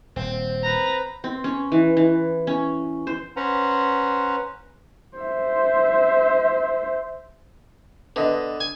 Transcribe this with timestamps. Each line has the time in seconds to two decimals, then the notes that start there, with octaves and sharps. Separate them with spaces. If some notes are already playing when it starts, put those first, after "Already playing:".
0.16 D#1 C4
0.63 B4 A#5
1.24 C4
1.44 C#4
1.72 E3
1.97 E3
2.47 C#4
3.07 C5
3.36 C#4 B4 C5 F#5 A#5
5.17 C5 E5
8.16 D3 B3 B4 D#5
8.60 G#5